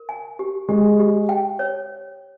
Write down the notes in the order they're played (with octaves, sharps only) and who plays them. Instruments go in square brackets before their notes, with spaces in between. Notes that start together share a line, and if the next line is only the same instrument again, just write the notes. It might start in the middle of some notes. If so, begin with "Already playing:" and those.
Already playing: [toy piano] A#4
G#5
G4
[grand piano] G#3 [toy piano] G4
[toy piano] G4
G5
C#5